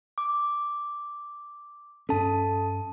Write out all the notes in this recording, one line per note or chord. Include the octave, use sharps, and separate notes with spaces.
D6
G2 C#4 A4 A5